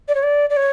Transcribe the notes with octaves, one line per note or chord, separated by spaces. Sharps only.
D5
C#5
D5
D5
C#5